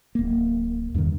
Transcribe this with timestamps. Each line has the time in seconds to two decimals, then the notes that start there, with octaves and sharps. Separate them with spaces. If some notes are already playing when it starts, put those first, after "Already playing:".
0.15 D1 A#3
0.94 E2 G2 C3 D#3